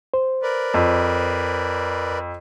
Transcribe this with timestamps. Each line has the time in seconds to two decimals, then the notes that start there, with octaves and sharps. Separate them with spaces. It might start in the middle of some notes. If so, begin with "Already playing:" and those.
0.14 C5
0.43 A#4 B4 D5
0.74 F2